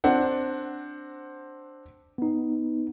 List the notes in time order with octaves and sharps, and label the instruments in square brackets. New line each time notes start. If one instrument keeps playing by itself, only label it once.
[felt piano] C4 D4 F#5
[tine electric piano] B3 D#4